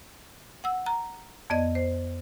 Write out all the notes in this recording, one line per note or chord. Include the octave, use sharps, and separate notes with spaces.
F#5 E6
A#5
F2 B3 D5 D#5 G#6
C5